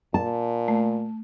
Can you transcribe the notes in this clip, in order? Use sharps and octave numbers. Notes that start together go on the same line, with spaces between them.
A#2 A5
A3